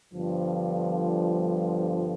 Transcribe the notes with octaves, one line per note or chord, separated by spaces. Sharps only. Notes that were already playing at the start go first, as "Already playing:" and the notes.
G1 G2 D3 F3